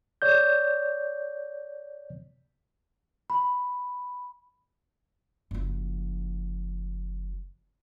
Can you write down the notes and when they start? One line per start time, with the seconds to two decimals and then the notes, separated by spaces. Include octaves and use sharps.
0.22 C#5 D5 G6
3.30 B5
5.51 F#1 F3